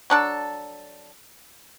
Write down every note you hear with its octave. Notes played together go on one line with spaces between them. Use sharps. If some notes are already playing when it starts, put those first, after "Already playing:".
F#3 D4 A4